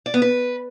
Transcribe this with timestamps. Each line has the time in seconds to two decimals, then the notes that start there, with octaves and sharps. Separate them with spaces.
0.06 D5
0.14 B3
0.22 B4